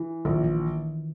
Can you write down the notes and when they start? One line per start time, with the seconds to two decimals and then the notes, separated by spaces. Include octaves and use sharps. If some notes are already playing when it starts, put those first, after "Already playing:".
Already playing: E3
0.25 A#1 D#3
0.44 E3